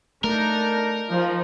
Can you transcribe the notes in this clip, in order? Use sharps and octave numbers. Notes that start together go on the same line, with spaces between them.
A3 D4 D#4 A#4
F3 D#4